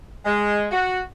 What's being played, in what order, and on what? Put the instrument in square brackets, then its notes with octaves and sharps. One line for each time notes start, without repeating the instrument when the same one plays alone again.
[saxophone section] G#3
F#4